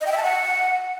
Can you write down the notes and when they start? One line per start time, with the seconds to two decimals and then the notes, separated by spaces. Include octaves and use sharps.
0.01 D#5
0.06 G5
0.12 E5
0.17 A5
0.23 F#5